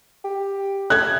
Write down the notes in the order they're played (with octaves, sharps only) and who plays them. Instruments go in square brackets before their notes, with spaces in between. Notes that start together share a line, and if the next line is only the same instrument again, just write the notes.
[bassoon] G4
[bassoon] A3 [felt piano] F#6 G#6